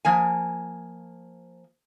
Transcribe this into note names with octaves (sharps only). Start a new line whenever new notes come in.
F3 A#3 G#5